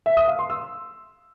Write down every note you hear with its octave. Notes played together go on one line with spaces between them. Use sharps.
E5
D#6
F5
C6
E6